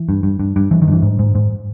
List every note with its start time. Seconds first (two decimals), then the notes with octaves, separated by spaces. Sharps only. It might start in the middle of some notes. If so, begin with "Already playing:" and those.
Already playing: E3
0.09 G2
0.23 G2
0.40 G2
0.56 G2
0.71 G2 E3
0.82 D#3
0.88 G2 E3
1.02 G#2
1.19 G#2
1.35 G#2